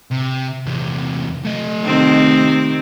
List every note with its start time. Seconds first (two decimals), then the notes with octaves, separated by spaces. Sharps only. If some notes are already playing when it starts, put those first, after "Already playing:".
0.11 C3
0.67 E2 C3
1.44 A3 D#5
1.85 C3 D#3 C4